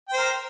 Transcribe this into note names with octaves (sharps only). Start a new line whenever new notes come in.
A#4 C5 G5